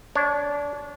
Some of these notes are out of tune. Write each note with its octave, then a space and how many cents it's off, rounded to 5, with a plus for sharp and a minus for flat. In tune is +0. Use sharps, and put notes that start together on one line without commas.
D4 -25 C#5 +0